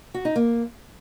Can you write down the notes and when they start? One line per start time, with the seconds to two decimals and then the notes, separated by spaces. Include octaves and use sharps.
0.14 F#4
0.25 D#4
0.36 A#3